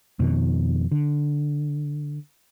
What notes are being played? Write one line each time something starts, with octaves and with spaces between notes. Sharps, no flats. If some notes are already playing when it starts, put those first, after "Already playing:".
F2 B2 D#3
D3